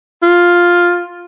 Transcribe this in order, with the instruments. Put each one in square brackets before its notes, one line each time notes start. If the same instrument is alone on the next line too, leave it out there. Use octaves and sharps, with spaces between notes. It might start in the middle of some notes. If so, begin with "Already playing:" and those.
[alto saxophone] F4